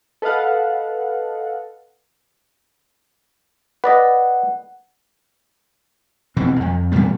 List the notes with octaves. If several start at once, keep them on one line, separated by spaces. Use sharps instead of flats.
A4 B4 D#5 F5 F#5
B4 D5 D#5 F#5
E1 B2 E3 C4
F2
A2 E3 G3 B3